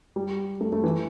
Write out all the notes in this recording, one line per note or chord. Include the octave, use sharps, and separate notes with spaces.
G3
A3
A3
E3